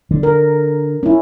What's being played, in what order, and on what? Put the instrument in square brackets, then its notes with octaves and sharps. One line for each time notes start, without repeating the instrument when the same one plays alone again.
[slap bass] D3
[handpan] A#4
C#4 E4